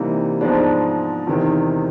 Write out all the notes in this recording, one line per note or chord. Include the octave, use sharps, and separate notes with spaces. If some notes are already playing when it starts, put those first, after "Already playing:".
Already playing: C3 E3 G3 A#3 D#4
G#2 F3 G#3 B3 D4
E2 C3 D#3